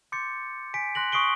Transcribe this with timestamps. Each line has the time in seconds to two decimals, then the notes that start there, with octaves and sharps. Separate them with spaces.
0.12 C6 D6 G6 A6 C#7
0.74 G#5 B6 D7
0.95 C6 F#6 A#6 F#7
1.12 C#6 D#6 C7 D7 G7